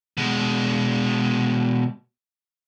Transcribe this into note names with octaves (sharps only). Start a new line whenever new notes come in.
B2 G#3